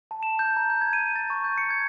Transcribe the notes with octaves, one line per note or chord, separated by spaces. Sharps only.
A5
E7
G6
A#5
G6
G#6
D#7
A6
C#6
G6
C#7
G#6